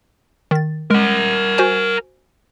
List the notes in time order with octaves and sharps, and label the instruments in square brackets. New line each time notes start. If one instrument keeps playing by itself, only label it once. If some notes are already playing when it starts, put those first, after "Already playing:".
[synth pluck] D#3 A6
[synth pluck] G#3 [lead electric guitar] A#4 F#5
[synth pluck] F#4 C5 G#5